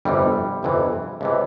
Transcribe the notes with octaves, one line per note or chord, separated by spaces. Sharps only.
G1 F2 C3 E3 G3
G1 F2 C3 E3
C#2 C3 E3